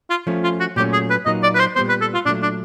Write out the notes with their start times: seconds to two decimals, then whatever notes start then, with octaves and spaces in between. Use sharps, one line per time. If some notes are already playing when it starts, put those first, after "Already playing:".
0.10 F4
0.27 F3 A3 C#4
0.44 F4
0.60 F#4
0.76 A#2 F#3 A3 C#4 G4
0.93 G#4
1.10 B4
1.26 A#2 F#3 A#3 D#4 D#5
1.43 D5
1.55 B4
1.60 C5
1.76 A#2 G3 B3 C5
1.89 B4
2.01 A4
2.14 F4
2.25 A#2 D4
2.28 F#3 A3
2.43 D4